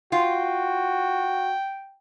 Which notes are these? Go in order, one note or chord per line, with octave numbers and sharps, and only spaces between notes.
F4 F#4 G5